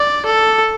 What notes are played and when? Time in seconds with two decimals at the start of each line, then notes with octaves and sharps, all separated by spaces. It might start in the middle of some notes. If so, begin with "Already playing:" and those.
Already playing: D5
0.26 A4